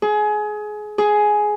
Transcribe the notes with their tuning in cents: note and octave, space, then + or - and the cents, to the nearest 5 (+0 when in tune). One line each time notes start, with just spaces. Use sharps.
G#4 +25
G#4 +10